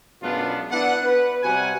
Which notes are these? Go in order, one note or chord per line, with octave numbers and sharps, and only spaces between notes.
F#2 B2 G#3 B3 D4 F4
B3 D4 E4 B4 F#5
B4
C3 G3 F#4 F#5 G#5